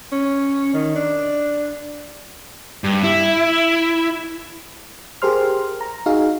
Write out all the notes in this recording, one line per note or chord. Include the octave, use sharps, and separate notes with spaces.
C#4
D#3
D4
G2
E4
G4 G#4 A#4 C5 C6 F6
A#5
D#4 F#4 G#4 F5